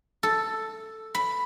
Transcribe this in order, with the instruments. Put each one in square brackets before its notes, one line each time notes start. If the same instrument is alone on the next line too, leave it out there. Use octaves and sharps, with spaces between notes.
[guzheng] A4
B5